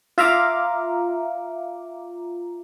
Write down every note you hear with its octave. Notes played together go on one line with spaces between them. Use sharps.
F4 E5 F5 A#5 D6